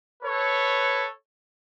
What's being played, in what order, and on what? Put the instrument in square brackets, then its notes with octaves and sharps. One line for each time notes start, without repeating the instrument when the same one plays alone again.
[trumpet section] A4 B4 C#5